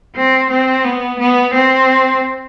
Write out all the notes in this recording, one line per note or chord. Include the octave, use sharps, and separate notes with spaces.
C4
C4
B3
B3
C4